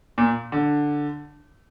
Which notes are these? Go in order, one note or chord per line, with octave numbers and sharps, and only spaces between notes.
A#2
D3